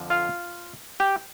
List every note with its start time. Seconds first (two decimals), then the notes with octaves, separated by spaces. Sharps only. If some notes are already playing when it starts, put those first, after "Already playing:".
Already playing: F2 D3 F3
0.10 F4 F5
1.00 G4 G5